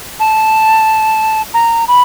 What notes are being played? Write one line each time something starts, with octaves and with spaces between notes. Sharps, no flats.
A5
A#5
B5